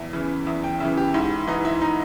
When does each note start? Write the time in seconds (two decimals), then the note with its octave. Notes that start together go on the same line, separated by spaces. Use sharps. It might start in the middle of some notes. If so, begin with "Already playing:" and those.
Already playing: E2 E5
0.13 C#3 E3
0.47 E2 E5
0.64 G5
0.80 C#3 E3 E5
0.97 G4
1.14 G#2 E4
1.47 E3 D#4
1.65 E4
1.81 D#4